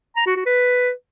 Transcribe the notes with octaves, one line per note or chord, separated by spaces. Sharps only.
A#5
F#4
F#4
B4